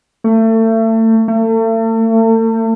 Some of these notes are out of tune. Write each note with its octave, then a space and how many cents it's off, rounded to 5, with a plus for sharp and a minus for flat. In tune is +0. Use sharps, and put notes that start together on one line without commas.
A3 +30
A3 +40